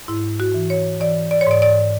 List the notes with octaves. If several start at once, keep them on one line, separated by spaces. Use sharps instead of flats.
G#2 E4
F#4
E3
C#5
E3 D5
D5
C#5
G#2 D5
D5